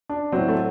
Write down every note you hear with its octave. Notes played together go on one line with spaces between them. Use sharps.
D4
A2 F#3 C4
A3